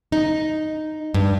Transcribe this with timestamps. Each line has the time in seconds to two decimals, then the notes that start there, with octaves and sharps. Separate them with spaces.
0.12 D#4
1.14 G2